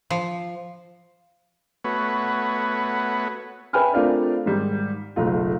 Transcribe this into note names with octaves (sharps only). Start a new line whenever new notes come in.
F3
A3 B3 F#4 B4 C#5
B4 E5 G5 G#5 B5 F6
A3 C4 D4 F4 A#4 D5
G#2 D#3 G3
F#1 B1 A3 F4